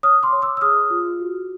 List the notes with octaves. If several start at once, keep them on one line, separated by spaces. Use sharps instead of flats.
C#5 D#6 F6
C6 D6
C#5
D6 E6
E6
G#4 D#6 F6
F4
F#4